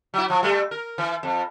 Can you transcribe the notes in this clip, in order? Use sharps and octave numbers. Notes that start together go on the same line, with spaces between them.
F#3 E4
F3
G3 A3
A#4
E3
F2